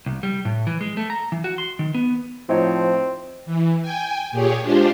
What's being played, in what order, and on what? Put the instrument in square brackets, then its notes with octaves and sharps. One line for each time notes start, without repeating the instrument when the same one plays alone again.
[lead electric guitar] C2
G3
A2
E3
G#3
A3
A#5
E3
F#4
C6
D#3
B3
[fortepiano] A2 D#4 C#5 [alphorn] F3 [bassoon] C4
[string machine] E3
G5 G#5
A#2 G4 G#4 C#5
G#3 D4 F4 G4 C5